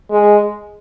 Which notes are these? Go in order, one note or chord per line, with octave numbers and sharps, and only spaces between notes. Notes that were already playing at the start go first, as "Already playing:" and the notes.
G#3